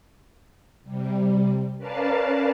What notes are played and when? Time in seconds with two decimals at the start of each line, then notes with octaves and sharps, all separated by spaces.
0.84 C3 G3
1.77 C#4 A#4 B4 D5 F5 A5